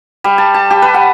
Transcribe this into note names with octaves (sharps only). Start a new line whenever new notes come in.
G3
A5
A5
G4
B4
F#5